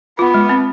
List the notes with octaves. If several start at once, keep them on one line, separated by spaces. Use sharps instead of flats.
B3 F4
G#3
C4